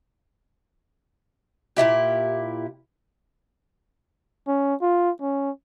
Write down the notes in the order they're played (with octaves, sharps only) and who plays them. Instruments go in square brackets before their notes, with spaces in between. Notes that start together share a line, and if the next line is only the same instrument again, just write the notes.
[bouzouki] A#2 C#3 E4 G4
[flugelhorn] C#4
F4
C#4